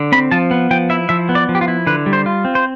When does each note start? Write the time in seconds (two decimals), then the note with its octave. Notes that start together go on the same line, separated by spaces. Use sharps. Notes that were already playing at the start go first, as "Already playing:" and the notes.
Already playing: D3
0.12 C4 B5
0.31 F3 A5
0.51 B3
0.71 F3 G5
0.90 E4 E5
1.09 F3 E5
1.29 B3
1.35 D5
1.49 F3
1.55 G4
1.61 F4
1.68 E4
1.87 D3 B4
2.06 G3
2.13 C5
2.26 F4
2.45 C4
2.55 C5